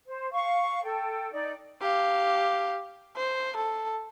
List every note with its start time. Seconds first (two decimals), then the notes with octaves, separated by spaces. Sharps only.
0.07 C5
0.32 F5 C#6
0.83 A4 G5
1.32 D#4 D5
1.81 G4 F5
3.16 C5
3.56 A4